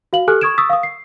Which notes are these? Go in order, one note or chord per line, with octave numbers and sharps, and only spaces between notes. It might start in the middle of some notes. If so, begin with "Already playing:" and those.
F#4 F5 F#7
G4 A4 G#5 F6 F#6
C#6 D#6 G#6 D7 E7
C#6 D#6 E6 A6 B6
F5 D#6
C7